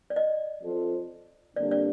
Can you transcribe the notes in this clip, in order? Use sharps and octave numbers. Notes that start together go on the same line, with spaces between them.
D5
D#5
F3 C4 F4 A4 C5
F2 D3 G3 A#3 D4 D5
D5